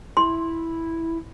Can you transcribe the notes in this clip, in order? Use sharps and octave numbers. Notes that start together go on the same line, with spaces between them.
E4 C6